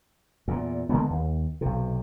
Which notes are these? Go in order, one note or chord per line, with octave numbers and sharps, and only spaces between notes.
E2 A#2
D3 G#3 A#3 B3
D#2
B1 C3